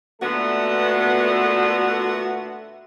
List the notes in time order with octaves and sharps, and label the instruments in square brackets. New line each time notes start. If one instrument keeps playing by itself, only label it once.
[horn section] A#2 D3 B3 [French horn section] A3 A4 [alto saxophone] F#4